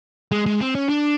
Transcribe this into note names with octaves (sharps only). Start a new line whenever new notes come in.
G#3
G#3
C4
C#4
D4